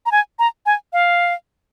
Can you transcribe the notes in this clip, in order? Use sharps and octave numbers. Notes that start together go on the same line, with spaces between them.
A#5
G#5
A#5
G#5
F5